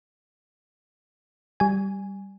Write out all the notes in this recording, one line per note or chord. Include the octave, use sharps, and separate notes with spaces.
G3 G#5